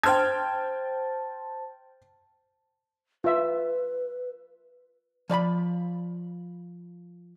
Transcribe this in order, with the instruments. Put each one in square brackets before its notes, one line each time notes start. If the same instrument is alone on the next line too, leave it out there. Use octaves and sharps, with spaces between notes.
[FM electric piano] C5 A5 [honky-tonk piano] G5 F6 G#6
[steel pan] F4 E5 [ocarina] B4
[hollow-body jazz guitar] F3 D5 A5 B5